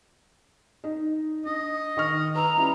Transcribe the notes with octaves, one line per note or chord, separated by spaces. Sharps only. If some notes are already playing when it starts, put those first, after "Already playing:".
D#4 D#5
D4 D#5
D#3 C#6 F6
B4 A#5 E6
G3 C#4 E4